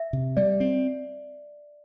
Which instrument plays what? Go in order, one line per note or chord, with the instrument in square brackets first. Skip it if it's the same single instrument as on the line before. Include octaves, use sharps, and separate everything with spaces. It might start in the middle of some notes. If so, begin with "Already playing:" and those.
Already playing: [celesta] E5
[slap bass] C3
[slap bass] G3 [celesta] D5
[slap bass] C4